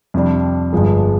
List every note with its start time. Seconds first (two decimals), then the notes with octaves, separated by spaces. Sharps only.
0.14 F2 C3 G3 D4
0.73 G1 G2 F3 G#3